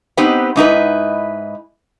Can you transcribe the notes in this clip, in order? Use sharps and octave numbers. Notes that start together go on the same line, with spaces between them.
B3 C4 D#4 G4 B4 D#5
G#2 D#4 E4 B4